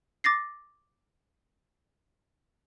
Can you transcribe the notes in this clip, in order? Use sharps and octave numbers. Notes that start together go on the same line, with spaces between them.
D6 A6 A#6 C7